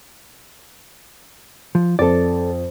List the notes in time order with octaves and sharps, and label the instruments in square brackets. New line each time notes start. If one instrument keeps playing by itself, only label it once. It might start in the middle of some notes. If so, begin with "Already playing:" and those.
[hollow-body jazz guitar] F3
[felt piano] F2 [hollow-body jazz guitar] A4 D5